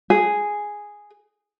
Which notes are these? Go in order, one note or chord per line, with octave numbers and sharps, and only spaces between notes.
G#4